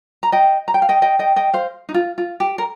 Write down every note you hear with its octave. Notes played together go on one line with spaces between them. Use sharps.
A#5
D#5 G5
A#5
G5
F5
D#5 G5
D#5 G5
D#5 G5
D#5 G5
C5 F5
D#4
F4
F4
G4
A#4